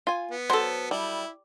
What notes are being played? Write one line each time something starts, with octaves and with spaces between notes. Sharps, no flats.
F4 G#5
B3
F#3 A4 C5
G3 E4